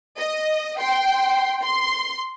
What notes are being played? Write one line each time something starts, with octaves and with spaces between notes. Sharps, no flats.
D#5
G5 C6
C6